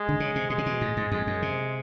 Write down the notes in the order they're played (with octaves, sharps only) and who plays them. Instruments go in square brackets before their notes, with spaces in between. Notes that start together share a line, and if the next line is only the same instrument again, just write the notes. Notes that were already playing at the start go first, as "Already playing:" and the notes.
Already playing: [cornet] G#3
[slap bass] D3
C#3
C3
[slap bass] B2 [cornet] G#3
[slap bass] C3
B2
A2
G#2
[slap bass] F2 [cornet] G#3
[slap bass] F#2
C3